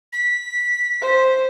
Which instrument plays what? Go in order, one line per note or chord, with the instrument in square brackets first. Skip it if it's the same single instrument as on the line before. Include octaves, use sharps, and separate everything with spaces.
[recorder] B6
[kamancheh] C5